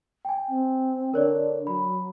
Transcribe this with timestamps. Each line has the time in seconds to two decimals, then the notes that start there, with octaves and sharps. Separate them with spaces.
0.25 G5 G#5
0.48 C4
1.14 D3 A#4 C#5 D5
1.67 F#3 B5